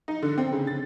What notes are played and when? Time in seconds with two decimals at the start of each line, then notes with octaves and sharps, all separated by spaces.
0.08 D#4
0.22 D3
0.38 C4
0.53 C#3
0.67 A6